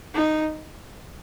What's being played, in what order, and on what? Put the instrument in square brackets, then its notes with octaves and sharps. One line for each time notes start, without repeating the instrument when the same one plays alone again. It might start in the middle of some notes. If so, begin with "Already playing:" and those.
[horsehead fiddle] D#4